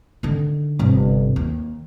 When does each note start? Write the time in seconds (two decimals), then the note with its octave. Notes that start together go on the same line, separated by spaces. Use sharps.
0.23 D3 D#3
0.79 G1 C3
1.36 D#2